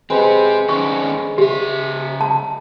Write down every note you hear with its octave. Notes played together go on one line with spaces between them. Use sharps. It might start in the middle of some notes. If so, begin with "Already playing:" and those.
G#3 C4 G4 B4 C5
D#3 C#4 D4 C#6
C#3 G4 E5
A5